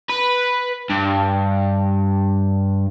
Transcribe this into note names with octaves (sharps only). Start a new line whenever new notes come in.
B4
G2